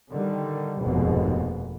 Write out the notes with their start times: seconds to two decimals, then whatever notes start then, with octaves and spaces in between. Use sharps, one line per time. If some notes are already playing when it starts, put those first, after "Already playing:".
0.11 D3 D#3 G3
0.81 F1 D#2 G#2 B2